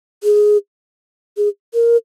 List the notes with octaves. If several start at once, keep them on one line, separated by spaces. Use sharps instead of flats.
G#4
G#4
A#4